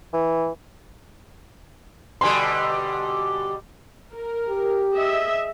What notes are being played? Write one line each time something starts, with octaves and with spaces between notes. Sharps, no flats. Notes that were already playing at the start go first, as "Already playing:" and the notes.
E3
B2 D3 G3 G#5 C6
A#4
G4
G#4 D#5 E5